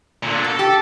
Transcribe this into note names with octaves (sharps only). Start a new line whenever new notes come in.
A#2 D3
B2 A4
G4